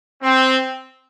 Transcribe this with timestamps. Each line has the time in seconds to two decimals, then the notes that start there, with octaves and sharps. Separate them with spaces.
0.23 C4